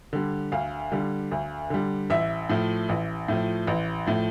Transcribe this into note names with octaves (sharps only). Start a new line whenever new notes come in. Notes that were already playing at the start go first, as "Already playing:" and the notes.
D3 G3
D2 F5
D3 G3
D2
D3 G3
A1 E5
A2 F3
A1
A2 F3
A1
A2 F3